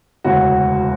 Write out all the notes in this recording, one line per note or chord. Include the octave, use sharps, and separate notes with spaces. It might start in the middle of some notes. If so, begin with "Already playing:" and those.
E1 D2 C#3 F#4